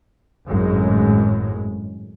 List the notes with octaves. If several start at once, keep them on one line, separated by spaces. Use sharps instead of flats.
G#1 F#2 A2 G#3